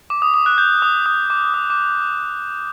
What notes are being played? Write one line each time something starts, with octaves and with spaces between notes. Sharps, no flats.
D6
D#6
D#6
F#6
G6
D#6
D#6
D6
D#6
D6